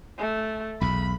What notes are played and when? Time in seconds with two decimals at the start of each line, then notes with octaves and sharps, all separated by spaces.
0.19 A3
0.81 B1 E2 B5